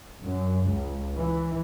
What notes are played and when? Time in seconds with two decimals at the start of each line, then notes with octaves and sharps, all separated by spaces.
0.22 F#2
0.68 C#2
1.16 E3